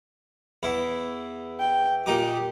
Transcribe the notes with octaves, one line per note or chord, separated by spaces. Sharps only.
E2 E4
G5
A#2 D#4 G4 D6